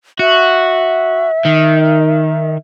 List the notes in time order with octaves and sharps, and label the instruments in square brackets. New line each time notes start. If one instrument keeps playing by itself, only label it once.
[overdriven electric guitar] F#4 [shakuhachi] E5
[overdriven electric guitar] D#3